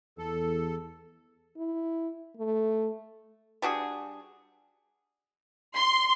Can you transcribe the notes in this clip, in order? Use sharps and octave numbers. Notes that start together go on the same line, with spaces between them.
E2 A4
E4
A3
G3 D4 F#4 G#4
C6